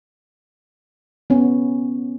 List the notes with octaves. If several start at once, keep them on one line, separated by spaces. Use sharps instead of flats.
B3 C#4